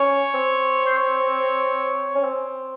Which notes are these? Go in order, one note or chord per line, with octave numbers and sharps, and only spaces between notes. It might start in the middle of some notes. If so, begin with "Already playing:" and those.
Already playing: C#4 C#5
C4
C5
C#5
C#4
C4